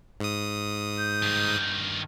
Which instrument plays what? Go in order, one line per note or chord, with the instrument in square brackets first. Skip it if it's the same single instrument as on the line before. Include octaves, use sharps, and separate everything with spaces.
[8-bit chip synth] G#2 D#6
[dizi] G6
[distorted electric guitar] G2 D#3